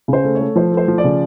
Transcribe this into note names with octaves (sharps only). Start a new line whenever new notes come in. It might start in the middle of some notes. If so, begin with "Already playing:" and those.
C#3
C5
A3
C#5
A3
F3 C5
A3
C5
F3
D5
C#3